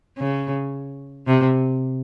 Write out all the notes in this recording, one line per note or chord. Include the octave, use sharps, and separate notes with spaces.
C#3
C3